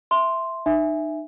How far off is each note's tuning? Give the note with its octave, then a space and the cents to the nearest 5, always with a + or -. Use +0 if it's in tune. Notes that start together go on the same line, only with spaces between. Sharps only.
E5 +0 C6 +0
D#4 -35 E5 +0 G#5 +0